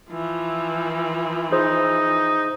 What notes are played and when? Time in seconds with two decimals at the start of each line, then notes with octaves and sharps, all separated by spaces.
0.10 E3 F3
1.52 D#4 G#4 C5